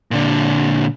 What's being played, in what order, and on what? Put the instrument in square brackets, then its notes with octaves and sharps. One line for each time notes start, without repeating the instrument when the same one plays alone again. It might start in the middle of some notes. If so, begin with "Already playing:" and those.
[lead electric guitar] A#2 D3